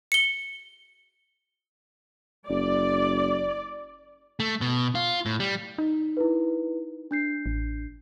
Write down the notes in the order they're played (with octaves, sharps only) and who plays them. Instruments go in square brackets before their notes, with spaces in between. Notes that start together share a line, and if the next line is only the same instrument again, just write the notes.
[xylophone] C#7 G7
[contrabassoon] F#1 [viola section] D5
[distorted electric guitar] A3
B2
F4
A2
G3
[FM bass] D#4
[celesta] E4 A#4 B4
D4 G6 C7
[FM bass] A1